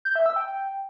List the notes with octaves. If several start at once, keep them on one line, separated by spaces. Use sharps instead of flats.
G6
E5
E6
G5